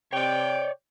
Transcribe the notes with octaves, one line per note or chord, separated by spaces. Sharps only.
C3 C#5 D5 G5